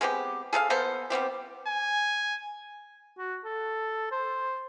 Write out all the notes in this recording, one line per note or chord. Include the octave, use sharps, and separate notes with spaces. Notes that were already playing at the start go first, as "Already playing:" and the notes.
G#3 B3 C4 G4
G#4 A4 B4 F5
A#3 B3 A4 C5
G3 B3 C4 G4
G#5
F#4
A4
C5